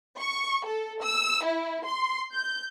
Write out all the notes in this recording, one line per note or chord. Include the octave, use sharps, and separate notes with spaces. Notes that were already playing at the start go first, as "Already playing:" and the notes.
C#6
A4
E6
E4
C6
G6